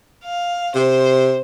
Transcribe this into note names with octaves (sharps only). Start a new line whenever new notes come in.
F5
C3 C5